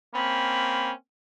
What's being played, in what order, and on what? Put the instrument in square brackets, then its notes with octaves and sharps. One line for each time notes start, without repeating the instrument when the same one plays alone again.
[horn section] A#3 C4 C#4 [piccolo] B5